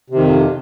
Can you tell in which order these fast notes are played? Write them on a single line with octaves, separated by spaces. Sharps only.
C3 D#3 F2